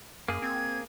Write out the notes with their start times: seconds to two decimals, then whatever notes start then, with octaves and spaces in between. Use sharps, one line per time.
0.28 F#2 A#3 G#4
0.42 C4 G#6